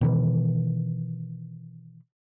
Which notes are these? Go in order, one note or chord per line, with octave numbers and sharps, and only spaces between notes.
B2 D#3 E3